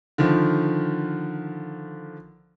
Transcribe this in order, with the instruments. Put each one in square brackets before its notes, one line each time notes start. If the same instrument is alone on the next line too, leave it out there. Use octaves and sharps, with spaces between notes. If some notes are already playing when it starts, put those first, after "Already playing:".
[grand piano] D3 D#3 F3